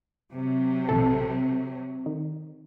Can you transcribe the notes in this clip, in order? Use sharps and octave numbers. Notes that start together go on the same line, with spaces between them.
C3 F#3
A#1 B2 A4
D#3